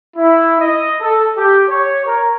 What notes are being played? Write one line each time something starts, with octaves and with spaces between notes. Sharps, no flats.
E4
D#5
A4
G4
C#5
A#4